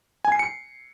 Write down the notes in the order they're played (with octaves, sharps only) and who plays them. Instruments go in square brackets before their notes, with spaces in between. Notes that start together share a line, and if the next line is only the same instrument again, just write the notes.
[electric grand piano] G#5
C7
C#7